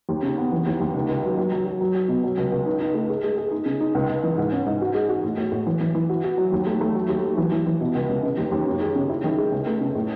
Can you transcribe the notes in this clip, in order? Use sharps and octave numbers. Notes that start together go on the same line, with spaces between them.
D#2
C#3
B3
E3
D#2
D#2
C#2
C#2
F#3
F#3
F#3
F#3
F#3
F#3
B2
F#3
C#2
C#2
D#4
D#4
A3
G#4
G#3
G#4
D#4
C#3
D#4
C#2
C#2
E3
G#2
C#4
G#2
F#4
G#3
F#4
A2
A2
A2
E3
E3
E3
F#4
F#4
F#3
D#2
A3
A3
F#3
D#2
F#3
E3
E3
E3
B2
C#2
C#2
C#3
D#2
D#2
F#2
G#3
C#3
E4
D#3
G#3
C#2
A3
C#3
A2